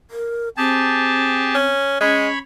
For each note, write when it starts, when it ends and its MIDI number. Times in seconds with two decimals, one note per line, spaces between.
0.11 0.49 70
0.57 1.68 60
0.57 1.56 67
0.57 1.56 68
0.57 1.56 81
1.55 1.99 61
2.01 2.28 56
2.01 2.35 61
2.01 2.38 73
2.01 2.38 83